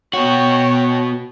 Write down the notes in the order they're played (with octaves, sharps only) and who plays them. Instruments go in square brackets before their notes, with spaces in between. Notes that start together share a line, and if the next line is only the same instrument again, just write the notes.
[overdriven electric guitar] B2 F#4 [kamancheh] C#5 G5